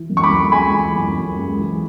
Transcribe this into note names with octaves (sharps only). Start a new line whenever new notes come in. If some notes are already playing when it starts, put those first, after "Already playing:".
Already playing: E3
F#2
C#6
B5 D6
F#2
G#3 G#5 B5
E3
F#2
F#2
G#3
E3